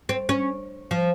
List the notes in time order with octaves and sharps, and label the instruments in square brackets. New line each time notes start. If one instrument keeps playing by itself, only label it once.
[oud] C4
C#4
F3